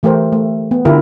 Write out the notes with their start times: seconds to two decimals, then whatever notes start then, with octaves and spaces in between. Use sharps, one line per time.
0.03 E3 A3 G4 A#4 C5
0.32 A3
0.71 B3
0.85 D3 E4 F4 G4 A#4